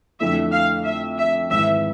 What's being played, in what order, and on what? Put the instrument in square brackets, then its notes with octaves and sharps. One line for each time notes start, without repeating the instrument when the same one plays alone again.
[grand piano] F2 D3 A3 E4 [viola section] E5
[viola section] F5
E5
E5
[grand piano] G#1 G#2 E3 [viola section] E5